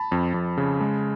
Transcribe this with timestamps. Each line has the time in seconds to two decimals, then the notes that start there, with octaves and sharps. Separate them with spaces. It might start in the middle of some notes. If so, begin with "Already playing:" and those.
Already playing: A5 B5
0.12 F2
0.34 F2
0.57 C#3
0.81 G#3